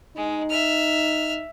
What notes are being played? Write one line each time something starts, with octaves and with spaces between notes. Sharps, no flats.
G#3 D#4
E5 F6